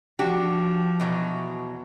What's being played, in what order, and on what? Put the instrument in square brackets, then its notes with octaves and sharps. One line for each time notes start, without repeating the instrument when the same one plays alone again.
[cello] F3 [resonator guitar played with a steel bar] D4 F#4 G4
[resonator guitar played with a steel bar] E2 B2 F#3